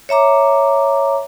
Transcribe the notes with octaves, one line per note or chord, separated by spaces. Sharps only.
C#5 E5 A#5 D6